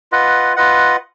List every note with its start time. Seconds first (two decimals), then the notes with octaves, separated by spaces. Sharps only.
0.12 F4 B4 D#5 F#5
0.56 F4 B4 D#5 F#5